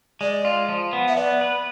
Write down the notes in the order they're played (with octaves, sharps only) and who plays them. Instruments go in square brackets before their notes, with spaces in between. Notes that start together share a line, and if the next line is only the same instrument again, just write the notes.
[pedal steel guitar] G#3 [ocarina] D5
[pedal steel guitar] F4
F3
B3
[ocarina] E5
[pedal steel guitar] B3 [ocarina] D5
[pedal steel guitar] B4